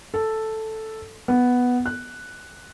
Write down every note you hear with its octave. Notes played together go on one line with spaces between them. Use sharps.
A4
B3
F#6